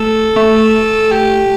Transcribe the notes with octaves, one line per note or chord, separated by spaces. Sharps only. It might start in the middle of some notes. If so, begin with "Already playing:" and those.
Already playing: A3 A4
A3
G4